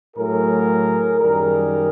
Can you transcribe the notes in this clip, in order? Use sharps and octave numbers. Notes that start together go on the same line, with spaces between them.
A2 F#3 A3 G#4 A#4
F#2 D#3 G3 G#4 A#4